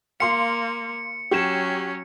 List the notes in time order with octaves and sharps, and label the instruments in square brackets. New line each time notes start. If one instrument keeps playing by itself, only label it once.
[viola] A#3 [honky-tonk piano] F5 C6 [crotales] C#7
[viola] F#3 C#4 [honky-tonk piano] G4 E7